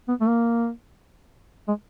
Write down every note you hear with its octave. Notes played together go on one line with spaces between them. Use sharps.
B3
A3
A#3
G#3